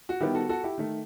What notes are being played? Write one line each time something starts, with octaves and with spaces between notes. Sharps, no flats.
F#4
D#3 G3 B3 E4 G4
F#4 A4
F#4 A4
E4 G4
D#3 A3